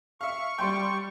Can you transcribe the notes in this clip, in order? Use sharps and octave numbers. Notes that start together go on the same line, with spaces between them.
E5 F5 C#6
G3 G5 C6